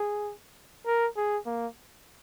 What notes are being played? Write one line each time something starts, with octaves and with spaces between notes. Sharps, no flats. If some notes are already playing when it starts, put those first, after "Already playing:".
Already playing: G#4
A#4
G#4
A#3